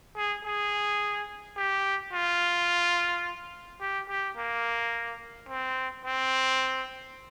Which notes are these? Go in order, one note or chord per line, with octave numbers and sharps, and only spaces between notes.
G#4
G#4
G4
F4
G4
G4
A#3
C4
C4